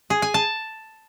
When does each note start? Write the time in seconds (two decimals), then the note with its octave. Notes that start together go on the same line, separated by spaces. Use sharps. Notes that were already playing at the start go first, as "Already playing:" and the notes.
0.10 G#4
0.22 G#5
0.34 A5